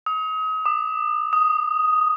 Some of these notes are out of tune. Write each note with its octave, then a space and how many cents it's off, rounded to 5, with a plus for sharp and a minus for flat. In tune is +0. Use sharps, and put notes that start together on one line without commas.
D#6 +35
D#6 -45
D#6 +5